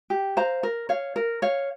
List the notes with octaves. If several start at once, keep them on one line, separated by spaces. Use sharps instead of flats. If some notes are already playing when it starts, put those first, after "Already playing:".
G4
C5 F5 A#5
A#4
C#5 F5
A#4
C#5 F5